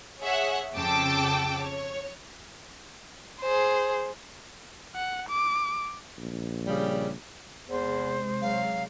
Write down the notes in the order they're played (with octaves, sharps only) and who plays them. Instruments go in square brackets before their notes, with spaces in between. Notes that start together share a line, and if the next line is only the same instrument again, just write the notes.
[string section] G#4 C#5 E5 F#5
F2 C#3 G5 A5 D6 E6
C#5
[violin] G#4 C5
[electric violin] F#5
D6
[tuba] A#1
[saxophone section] C#3 G3
[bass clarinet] E2 [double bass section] C3 G#3 [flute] C5
[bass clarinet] F#3 [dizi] F5